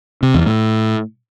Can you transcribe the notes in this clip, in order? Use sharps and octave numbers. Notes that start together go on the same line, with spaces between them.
C3
E2
A2